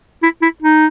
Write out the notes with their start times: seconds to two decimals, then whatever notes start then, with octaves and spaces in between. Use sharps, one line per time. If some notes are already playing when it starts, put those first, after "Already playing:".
0.23 E4
0.42 E4
0.63 D#4